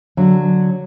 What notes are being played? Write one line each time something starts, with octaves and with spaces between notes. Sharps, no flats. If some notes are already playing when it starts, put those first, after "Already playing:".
D3 F#3